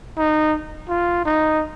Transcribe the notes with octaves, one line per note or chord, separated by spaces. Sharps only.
D#4
F4
D#4